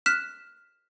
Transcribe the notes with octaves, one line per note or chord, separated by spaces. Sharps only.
F6 F#6 B6 E7